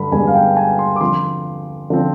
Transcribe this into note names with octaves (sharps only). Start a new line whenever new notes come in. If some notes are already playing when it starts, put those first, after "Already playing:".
Already playing: G2 D3 B5
G2 D3 G#3 B3 G#5
F5
G5
G#5
C6
D6
D3 F3 C4 C6
D3 F3 C4